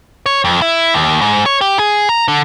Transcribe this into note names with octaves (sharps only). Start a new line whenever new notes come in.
C#5
F2
E4
D#2
G#2
C#5
G4
G#4
A#5
D3